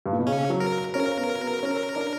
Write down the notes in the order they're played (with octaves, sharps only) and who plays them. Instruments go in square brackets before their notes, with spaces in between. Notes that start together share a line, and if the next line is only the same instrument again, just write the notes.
[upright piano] G2
A#2
B2
[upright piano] C#3 [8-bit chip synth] C#4
[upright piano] F#3
[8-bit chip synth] A#4
[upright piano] C#4 [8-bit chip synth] A#4
[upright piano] B3
B3
C#4
D4